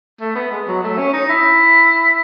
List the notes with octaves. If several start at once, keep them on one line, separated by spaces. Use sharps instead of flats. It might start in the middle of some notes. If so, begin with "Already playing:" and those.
A3
B3
G#3
F#3
A3
C#4
D#4
E4